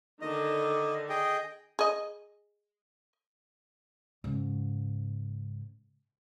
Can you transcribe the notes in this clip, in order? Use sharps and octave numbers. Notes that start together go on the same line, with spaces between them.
D3 D#3 D#5
G#4 D#5 G5
G#4 D#5
G#2 C#3